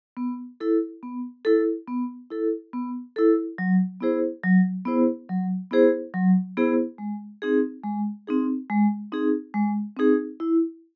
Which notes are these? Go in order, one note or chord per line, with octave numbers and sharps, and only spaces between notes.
B3
E4 A4
B3
E4 A4
B3
E4 A4
B3
E4 A4
F#3
B3 E4 G#4 C5
F#3
B3 E4 G#4 C5
F#3
B3 E4 G#4 C5
F#3
B3 E4 G#4 C5
G#3
C4 D#4 G#4
G#3
C4 D#4 G#4
G#3
C4 D#4 G#4
G#3
C4 D#4 G#4
E4